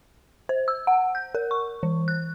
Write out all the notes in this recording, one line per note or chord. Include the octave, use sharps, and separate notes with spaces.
C5
E6
F#5
G6
A#4
C#6
E3
F#6